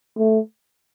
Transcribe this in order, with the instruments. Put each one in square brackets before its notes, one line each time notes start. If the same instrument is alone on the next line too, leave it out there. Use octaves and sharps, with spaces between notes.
[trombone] A3